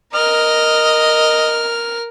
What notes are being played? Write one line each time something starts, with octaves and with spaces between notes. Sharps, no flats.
A#4 D#5 F6